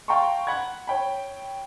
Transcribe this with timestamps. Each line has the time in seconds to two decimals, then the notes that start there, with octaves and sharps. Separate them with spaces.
0.08 F5 G5 A5 A#5 C6 C#6
0.47 F#5 B5 G#6
0.87 C#5 G5 B5